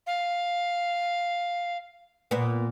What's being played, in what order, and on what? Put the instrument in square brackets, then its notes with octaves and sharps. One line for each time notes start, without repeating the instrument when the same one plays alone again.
[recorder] F5
[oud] A#2 B3